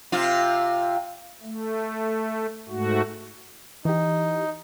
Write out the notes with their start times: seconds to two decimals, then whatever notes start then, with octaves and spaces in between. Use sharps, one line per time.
0.12 C3 F4
1.42 A3
2.69 G#2 A3 F#4
3.85 E3 D#4 G4